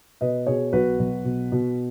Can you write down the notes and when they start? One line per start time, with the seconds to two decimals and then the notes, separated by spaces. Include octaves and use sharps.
0.21 B2 B4 D#5
0.47 B2 G#4 C#5
0.73 B1 F#4 B4
0.99 B1
1.25 B2
1.52 B2